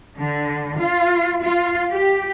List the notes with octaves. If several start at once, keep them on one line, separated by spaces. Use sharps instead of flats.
D3
F4
F4
G4